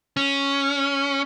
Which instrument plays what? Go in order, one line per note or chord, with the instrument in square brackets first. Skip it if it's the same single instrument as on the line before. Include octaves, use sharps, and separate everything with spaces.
[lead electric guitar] C#4